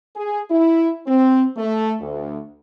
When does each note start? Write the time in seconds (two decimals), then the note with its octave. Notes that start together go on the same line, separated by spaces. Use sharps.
0.16 G#4
0.50 E4
1.07 C4
1.57 A3
2.01 D2